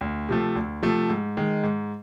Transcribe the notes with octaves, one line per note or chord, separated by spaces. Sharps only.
D2
C3 F3 A3
D2
C3 F3 A3
G#2
D#3 G#3
G#2